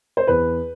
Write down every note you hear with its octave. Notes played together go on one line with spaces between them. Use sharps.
C5
E2 B4